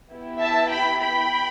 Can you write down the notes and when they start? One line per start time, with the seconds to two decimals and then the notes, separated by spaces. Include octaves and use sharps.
0.11 B3 E4 G4
0.40 E5 A5
0.71 G5 B5
1.00 G5 B5